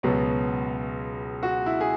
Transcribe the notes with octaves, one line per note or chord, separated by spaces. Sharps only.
C#2 B2 F#3 B3
F#4
E4
G#4